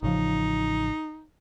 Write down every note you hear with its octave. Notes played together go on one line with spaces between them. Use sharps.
A1 C#3 F3 D#4